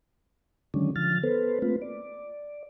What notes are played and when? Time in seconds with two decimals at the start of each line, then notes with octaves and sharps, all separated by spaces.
0.74 D3 D#3 F#3 G#3 C#4 D4
0.96 D3 F3 F6 A6
1.23 B3 A4 B4 C5
1.62 A3 A#3 C4 F4 B4
1.82 D5